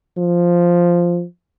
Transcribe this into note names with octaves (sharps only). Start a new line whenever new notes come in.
F3